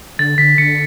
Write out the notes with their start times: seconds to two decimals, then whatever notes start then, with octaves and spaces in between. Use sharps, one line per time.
0.19 D3 A6
0.38 D3 B6
0.58 D3 C#7